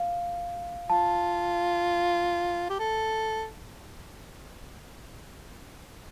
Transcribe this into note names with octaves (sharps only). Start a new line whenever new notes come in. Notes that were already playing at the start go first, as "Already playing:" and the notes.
Already playing: F5
F4 A5
G4
A4